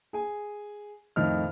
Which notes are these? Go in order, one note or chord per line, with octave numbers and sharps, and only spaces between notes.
G#4 G#5
F2 A2 D#3 D#5 F6